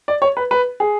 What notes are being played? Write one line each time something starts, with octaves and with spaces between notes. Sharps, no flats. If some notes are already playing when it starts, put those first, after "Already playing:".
D5
C#5
B4
B4
G#4